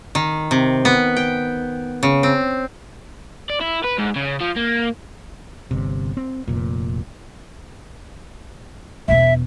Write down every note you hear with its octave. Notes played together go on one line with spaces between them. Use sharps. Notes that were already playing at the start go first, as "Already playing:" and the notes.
D#3
C3
B3
G5
C#3
C4
D5
E4
B4
G#2
C#3
F3
A#3
G1 C3
C4
F1 A#2
E1 B3 E5